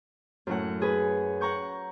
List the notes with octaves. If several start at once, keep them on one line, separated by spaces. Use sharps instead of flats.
F#2 A2 F#5
F#4 G#4 B4
F#5 A#5 C#6 G6